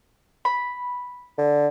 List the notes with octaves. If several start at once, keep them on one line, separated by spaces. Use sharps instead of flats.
B5
D3